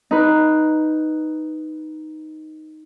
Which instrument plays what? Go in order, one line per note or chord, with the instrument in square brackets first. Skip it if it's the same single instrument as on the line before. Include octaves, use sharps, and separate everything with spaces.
[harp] D#4 B4